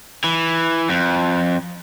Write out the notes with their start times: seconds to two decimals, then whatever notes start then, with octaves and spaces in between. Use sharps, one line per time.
0.24 E3
0.90 F2